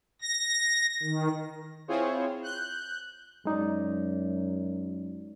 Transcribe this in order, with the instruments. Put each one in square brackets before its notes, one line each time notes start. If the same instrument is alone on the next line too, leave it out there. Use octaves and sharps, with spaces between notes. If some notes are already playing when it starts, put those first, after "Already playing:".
[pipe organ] A#6
D#3
[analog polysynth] C4 E4 F4 G#4 C5 C#5
F#6 G6
[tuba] F#2 [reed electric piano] G#3 D#4 D5